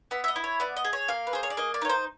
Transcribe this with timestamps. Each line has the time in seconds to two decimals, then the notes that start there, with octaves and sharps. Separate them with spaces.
0.11 B3 E5
0.24 E5
0.28 D#5
0.36 E4
0.44 C#5
0.60 B3 D5
0.76 D#5
0.85 G#4
0.93 C#5
1.08 A#3 F5
1.27 B4
1.33 G#4 C5
1.43 C#5
1.50 D5
1.57 A#3 D#5
1.74 D5
1.82 D#4 C#5
1.89 C5